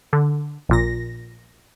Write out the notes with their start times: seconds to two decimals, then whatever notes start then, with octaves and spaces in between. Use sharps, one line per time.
0.13 D3
0.69 A#1 A#2 A#6